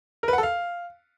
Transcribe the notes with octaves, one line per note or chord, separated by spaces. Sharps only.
A#4
B4
F#5
A4
F5